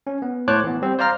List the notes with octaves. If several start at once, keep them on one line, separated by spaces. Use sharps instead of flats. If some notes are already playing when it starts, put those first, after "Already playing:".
C#4
B3
A2 C5 C#5 A5 D6 F#6
E3 B3
G3 C4
C5 D5 F5 A#5 F6